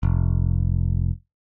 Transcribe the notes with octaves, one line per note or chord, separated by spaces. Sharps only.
F1